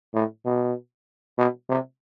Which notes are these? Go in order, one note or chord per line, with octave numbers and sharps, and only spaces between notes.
A2
B2
B2
C3